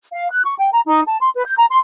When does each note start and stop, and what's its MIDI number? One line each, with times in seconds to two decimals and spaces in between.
0.12 0.31 77
0.31 0.41 90
0.45 0.55 85
0.59 0.69 79
0.72 0.81 82
0.86 1.00 63
1.06 1.16 81
1.21 1.30 84
1.34 1.45 71
1.45 1.55 91
1.57 1.66 82
1.70 1.77 84